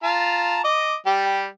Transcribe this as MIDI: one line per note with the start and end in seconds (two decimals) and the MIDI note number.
0.03 0.60 65
0.03 0.60 81
0.03 0.60 82
0.64 0.95 75
0.64 0.95 86
1.06 1.47 55
1.06 1.47 67